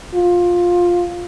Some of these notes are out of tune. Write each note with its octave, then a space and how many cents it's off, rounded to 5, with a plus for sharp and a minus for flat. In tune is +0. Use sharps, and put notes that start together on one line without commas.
F4 +10